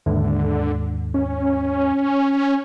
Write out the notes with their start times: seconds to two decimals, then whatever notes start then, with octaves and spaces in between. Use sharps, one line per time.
0.06 D#2 G#2 D3
1.14 C#4